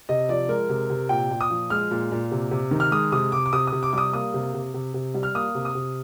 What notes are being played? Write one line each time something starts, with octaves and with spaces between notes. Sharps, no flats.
C3 D#5
F3 D5
G#3 A#4
C3
C3
A#2 G5
A#2
D#6
F3
G#3 F6
A#2
A#2
C3
C3
D#3
F6
G#3 D#6
C3 D#6
C3 D6
D6
C3 D#6
C3 D#6
D6
G3 D6 D#6
A#3 D#6
C3
C3
C3
C3
G3
F6
A#3 D#6
C3
D#6
C3